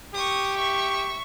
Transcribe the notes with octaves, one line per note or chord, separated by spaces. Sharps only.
G4 C#6 D#6
E5 C#6